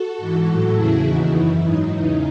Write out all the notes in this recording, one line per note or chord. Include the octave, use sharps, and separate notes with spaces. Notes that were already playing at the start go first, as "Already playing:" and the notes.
Already playing: F#4 A4
G#2 E3
A2 F#3
E2 C#3 E3 E4 G#4
D#2 C#3 E3 D#4 F#4
F#2 E3 E4
G#2 F#3 D#4
E2 C#3 E3